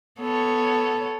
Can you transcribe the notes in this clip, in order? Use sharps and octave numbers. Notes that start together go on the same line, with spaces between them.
B3 A4 C#5